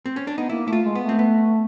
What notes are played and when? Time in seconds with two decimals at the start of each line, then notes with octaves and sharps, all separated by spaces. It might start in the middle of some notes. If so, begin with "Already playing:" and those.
0.06 C4
0.16 C#4
0.27 D4
0.37 B3 D#4
0.49 A#3 E4
0.67 A3 E4
0.73 F4
0.84 G#3
0.95 B3
1.02 A3
1.09 C4
1.19 B3